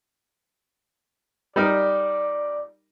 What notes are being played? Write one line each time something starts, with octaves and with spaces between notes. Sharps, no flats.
G3 D#4 A#4 D5